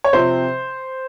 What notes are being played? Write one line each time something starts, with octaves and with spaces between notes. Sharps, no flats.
C#5
C3 F3 C4 C5